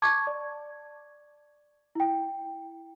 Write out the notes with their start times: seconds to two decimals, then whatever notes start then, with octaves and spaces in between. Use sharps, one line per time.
0.02 A5 C#6 D6 G#6
0.27 D5
1.95 E4 G5